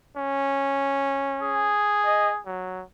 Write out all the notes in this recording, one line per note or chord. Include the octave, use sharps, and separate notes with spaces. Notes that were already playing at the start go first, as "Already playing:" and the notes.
C#4
G#4
D#5
F#3